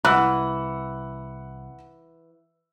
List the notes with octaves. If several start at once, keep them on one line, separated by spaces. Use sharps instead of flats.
C2 E3 F#5 E6 F#6